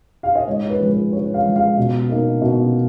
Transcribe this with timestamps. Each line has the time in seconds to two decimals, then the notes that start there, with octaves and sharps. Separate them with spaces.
0.23 F5
0.35 D#5
0.47 G#2 C#5
0.70 B4
0.80 F3 G#3
0.91 B4
1.12 G#2 C#5
1.34 F5
1.45 F3 G#3
1.56 F5
1.78 B2
2.09 A#3 D#4
2.42 B2